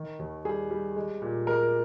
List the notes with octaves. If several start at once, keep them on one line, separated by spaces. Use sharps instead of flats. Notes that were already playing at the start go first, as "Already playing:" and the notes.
Already playing: D#3
D#2
G3 G#4
G3
G#3
A#2
G#3 A#4